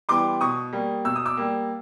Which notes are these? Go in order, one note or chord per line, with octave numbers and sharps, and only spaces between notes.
E3 G3 B3 C6 D6
B2 C#6 D#6
G3 A#3
B2 E6
D#6
D6 E6
G3 A#3